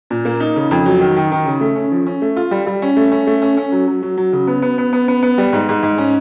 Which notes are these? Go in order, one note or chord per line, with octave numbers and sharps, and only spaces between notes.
A#2
A#3
D#4
C#3
F2
F#3
D#3
D#3
D#3
C#3
A3
C#4
F3
C#4
A3
F4
G3
G3
C#4
A3
C#4
A3
C#4
C#4
F#3
F#3
F#3
F#3
C#3
B3
B3
B3
B3
B3
B3
G3
G#2
G#2
G#2
C#4